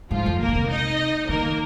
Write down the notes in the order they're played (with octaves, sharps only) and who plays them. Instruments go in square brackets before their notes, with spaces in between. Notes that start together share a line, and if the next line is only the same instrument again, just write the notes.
[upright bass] G#2 [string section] F3 F4
[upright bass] F2
[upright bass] A#2 [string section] A#3 A#4
[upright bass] D#3
C3
[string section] D#4 D#5
[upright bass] D#3 [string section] A#3 A#4